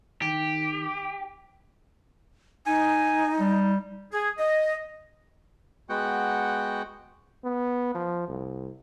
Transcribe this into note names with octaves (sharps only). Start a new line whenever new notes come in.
D#3 G4
D#4 G#5
G3
G#4
D#5
G#3 B3 F#4 F#5 G5
B3
F3
C2